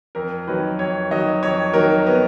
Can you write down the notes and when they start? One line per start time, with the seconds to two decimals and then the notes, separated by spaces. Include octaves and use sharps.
0.15 F2 A#4
0.48 D#3 F#3 B4
0.79 F2 C#5
1.11 D#3 F#3 D#5
1.43 F2 C#5
1.74 D#3 F#3 A#4
2.07 B3